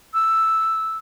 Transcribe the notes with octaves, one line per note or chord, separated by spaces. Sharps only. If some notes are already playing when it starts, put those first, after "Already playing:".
E6